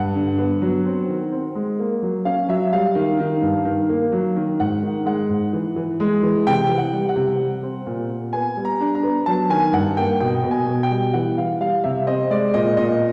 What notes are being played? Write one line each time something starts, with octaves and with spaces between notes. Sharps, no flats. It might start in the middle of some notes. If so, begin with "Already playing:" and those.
Already playing: G2 F#5
D3
B3
F#3
C4
D#3
C4
G#3
A#3
F#3
C#4 F5
F#3 E5
G3 F5
D#3
D#3
G2
D#3
A#3
F#3
D#3
G#2 F#5
D#3
G#3 F#5
G#2
E3
E3
G#3
E3
C3 G5
E3
F#5
G3
F#5
C3
G3
C4
A#2
A#2
B3 G#5
G3
A#5
D4
A#5
B3
F#3 A5
D#3 G#5
G2 F#5
A#3 G5
B2 G5
B2
G#5
B2
G5
G3
E3 F#5
E3 F5
G3 F5
C3 E5
C4 D#5
G#3 D5
A#2 D#5
A#2 D#5